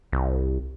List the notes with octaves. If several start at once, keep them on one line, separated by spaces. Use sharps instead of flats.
C2